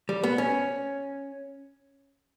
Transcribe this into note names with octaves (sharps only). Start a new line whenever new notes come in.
G3
B3
C#4